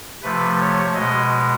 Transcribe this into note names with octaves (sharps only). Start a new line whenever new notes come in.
C3 F3 A3 B4
C#5
B2 G#3 D#5